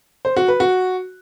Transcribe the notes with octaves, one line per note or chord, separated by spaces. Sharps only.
C5
F#4
B4
F#4